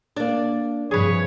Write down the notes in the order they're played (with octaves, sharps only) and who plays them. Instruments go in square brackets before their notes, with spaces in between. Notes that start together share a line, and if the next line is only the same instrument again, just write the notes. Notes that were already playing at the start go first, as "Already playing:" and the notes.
[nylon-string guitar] A#3 D4 [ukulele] D5
[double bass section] G2 C3 F3 [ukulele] G#4 B4 [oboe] C#5